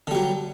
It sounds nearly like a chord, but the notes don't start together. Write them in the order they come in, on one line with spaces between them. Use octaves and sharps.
D3 G3 F#3